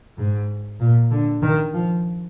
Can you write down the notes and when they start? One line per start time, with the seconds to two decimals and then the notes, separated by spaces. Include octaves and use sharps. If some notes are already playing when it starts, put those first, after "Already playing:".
0.18 G#2
0.80 A#2
1.11 D3
1.42 D#3
1.74 F3